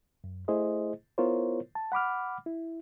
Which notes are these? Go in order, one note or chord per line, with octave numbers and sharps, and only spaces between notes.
F#2
A3 E4 G#4 C5 D#5
B3 E4 F4 A#4 C5 C#5
A5
F#5 B5 D6 F6
E4